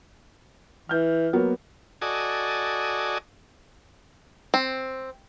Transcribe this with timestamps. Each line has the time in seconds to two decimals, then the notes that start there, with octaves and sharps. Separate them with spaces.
0.89 E3 F6 G6
1.33 F#3 A#3 B3
2.01 F#4 A4 D5 D#5 G#5
4.54 C4